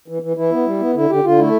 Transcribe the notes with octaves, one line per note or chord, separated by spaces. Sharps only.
E3
E3
E3 E4
B3
G3
B3
D3 E4
D3 G4
D3 F4
A3 E4